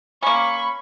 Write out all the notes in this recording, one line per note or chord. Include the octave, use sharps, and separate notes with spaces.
A#3 C#4 B5 C#6